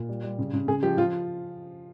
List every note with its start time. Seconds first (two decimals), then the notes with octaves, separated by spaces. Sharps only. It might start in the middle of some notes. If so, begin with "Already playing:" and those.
Already playing: A#2
0.09 G3
0.23 G3
0.38 C#3
0.53 C#3
0.68 C#3 G#4
0.83 F3 G4
0.97 F3 F4